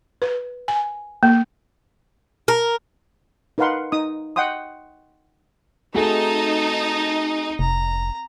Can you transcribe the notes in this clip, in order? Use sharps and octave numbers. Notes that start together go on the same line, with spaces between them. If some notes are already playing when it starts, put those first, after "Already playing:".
B4
G#5
A#3
A#4
D#4 A#4 B4 F5 F#5 C6
D#4 D#6
D#5 F#5 G5 C6 D#6
A3 C4 D#4 F#4 G#4 A5
F1 A#5